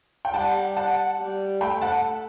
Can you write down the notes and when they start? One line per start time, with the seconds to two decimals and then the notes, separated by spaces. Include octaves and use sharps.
0.25 G5
0.34 G3 F#5 A5
0.77 F#5 A5
1.19 G3
1.61 A3 G5 B5
1.82 F#5 A5